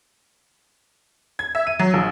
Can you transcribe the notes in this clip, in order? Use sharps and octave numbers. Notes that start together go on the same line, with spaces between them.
G#6
E5
D#7
F#3
A#1